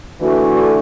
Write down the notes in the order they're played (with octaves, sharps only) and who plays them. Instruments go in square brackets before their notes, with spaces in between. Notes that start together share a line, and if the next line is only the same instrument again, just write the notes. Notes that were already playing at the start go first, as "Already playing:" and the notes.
[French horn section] D3 E3 A3 [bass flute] F#4